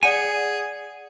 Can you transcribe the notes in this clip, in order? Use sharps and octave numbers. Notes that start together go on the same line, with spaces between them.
G#4 D5 F#5 G#5 C#7